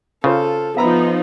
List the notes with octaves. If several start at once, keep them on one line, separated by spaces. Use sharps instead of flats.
C#3 F4 A4 C5
F3 B3 D#4 E5 A#5 B5